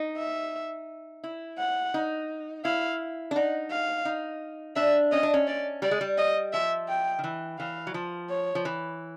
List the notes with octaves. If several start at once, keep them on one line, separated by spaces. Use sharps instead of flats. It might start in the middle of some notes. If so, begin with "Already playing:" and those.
Already playing: D#4
E5
E4
F#5
D#4
E4 F5
D4
D#4 F#5
F5
D#4
D4 E5
C#4 D#5
D4
C#4
D5
G3 D5
G#3
G3
D#5
F3 E5
G5
D#3
E3
E3 F5
F#3
F3
C#5
F3
E3